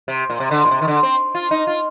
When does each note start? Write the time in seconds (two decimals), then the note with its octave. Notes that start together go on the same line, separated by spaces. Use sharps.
0.08 C3
0.30 A#2
0.40 C3
0.51 D3
0.65 A#2
0.71 C3
0.81 D#3
0.88 D3
1.03 C4
1.35 F4
1.51 D#4
1.67 F4